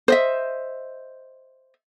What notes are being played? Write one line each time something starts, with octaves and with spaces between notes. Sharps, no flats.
C5 D#5 E5